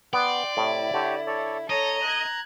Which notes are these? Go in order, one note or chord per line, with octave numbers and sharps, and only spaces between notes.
B3 D5 G5 C6
A2 C3 E4
D3 G4 C#5
A4 C#5 D5
A4 C#5 D#5 A#5
F#6 G#6